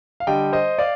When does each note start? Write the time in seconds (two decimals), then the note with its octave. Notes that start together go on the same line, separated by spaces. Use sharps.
0.20 F5
0.27 D3 G3 D#5 G5
0.53 C5 D#5
0.79 D5 F5